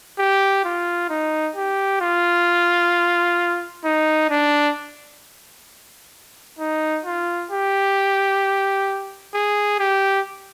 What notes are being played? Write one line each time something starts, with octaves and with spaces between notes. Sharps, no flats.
G4
F4
D#4
G4
F4
D#4
D4
D#4
F4
G4
G#4
G4